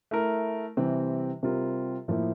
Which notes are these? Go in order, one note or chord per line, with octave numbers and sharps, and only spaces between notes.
A3 E4 A#4
C3 E3 G3 C4
C3 G3 C4 F4 A#4
A2 F3 A#3 E4